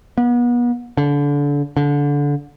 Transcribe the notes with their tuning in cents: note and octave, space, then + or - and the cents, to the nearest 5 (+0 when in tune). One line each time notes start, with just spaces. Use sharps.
B3 -35
D3 -30
D3 -25